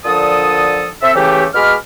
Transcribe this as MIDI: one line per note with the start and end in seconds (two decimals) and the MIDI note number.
0.05 0.88 46
0.05 0.88 50
0.05 0.88 53
0.05 0.88 69
0.05 0.88 81
0.05 0.88 87
1.02 1.12 60
1.02 1.12 69
1.02 1.12 76
1.15 1.44 45
1.15 1.44 49
1.15 1.44 52
1.15 1.44 57
1.15 1.44 67
1.54 1.75 47
1.54 1.75 56
1.54 1.75 83
1.54 1.75 86
1.54 1.75 89